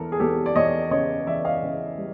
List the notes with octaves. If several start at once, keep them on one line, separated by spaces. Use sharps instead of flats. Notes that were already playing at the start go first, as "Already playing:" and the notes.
Already playing: E2 E3 A4 A#4
G#4
E2 G4 A4
D5
E2 C#5 D#5
C#3 C#5 D#5
E3 D5 E5
D#5 F5
C#3
G3